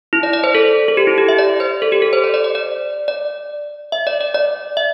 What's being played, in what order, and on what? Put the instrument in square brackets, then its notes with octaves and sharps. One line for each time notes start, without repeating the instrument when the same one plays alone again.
[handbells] E4
D5
D5
C5
A4
A4
G4
E4
G4
E5
D5
C5
A4
G4
A4
C5
D5
D5
D5
D5
D5
E5
D5
D5
D5
E5